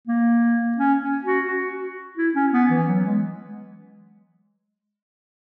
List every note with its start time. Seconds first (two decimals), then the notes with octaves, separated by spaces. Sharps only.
0.07 A#3
0.78 C#4
1.02 C#4
1.24 F#4
1.47 F#4
2.17 E4
2.34 C#4
2.53 B3
2.70 E3
2.87 F#3
3.05 G#3